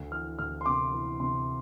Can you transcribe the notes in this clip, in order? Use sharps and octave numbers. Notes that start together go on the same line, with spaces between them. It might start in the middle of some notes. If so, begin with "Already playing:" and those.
Already playing: D2
E3 F6
D2 F6
C6
C3 D6
E3
C3 C6